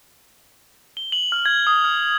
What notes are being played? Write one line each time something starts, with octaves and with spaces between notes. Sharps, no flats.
G7
F#7
F6
G#6
D#6
F6